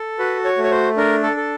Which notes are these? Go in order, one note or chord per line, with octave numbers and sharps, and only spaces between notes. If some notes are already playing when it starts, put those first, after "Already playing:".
Already playing: A4
F#4 B4
C#5
A3
C#5
C5
D4 A#4
A4
A4